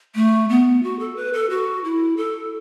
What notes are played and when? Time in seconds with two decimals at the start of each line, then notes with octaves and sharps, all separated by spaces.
0.15 A3
0.50 B3
0.83 F#4
0.99 A4
1.16 B4
1.33 A4
1.50 F#4
1.84 E4
2.17 A4